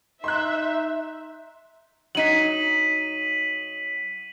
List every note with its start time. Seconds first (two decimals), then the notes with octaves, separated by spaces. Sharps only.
0.24 D#4 E5 C6 F#6
2.15 F#3 D#4 B6 D#7 F#7